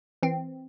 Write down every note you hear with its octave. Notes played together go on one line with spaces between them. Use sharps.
E3 C4